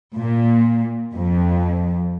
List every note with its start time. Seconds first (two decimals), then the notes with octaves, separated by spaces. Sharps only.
0.17 A#2
1.15 F2